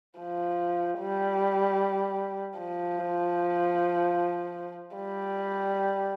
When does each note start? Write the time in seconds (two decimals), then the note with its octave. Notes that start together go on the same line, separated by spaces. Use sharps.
0.20 F3
0.99 G3
2.58 F3
4.96 G3